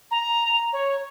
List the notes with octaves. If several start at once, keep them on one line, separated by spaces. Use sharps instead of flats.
A#5
C#5